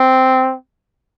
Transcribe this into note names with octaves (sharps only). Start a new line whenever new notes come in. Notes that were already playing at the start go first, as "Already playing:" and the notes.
Already playing: C4